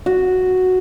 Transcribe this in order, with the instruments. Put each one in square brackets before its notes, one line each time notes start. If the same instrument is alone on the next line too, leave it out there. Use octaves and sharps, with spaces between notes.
[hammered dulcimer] F#4